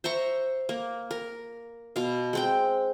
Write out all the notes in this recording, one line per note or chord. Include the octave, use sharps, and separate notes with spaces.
C5 E5 A#5 C#6
A#3
A#4
B2 F5
G#3 C4 G5